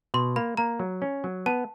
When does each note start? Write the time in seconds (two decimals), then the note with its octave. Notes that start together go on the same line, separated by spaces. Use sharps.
0.14 B2 C6
0.36 A#3 B5
0.57 A#3 A#5
0.79 F#3
1.02 C#4
1.24 F#3
1.46 B3 A5